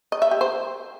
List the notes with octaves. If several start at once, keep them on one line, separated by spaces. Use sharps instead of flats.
D#5
E5
G4
C5